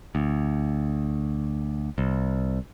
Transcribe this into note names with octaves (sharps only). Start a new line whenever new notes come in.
D2
C2